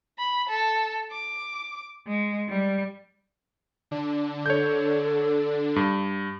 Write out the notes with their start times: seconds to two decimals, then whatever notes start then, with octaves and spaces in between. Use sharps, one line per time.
0.19 B5
0.49 A4
1.11 D6
2.07 G#3
2.49 G3
3.91 D3 D4
4.46 A4 C#5 G6
5.76 G2